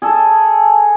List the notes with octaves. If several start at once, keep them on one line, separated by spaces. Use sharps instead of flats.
G#4 A4